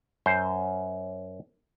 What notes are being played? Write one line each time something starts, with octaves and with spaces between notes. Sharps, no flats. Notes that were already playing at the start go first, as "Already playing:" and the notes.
F#2 C5